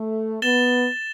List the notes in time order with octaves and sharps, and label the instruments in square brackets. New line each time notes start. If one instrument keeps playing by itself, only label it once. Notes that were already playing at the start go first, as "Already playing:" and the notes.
Already playing: [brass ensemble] A3
[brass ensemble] B3 [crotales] A6 E7 G7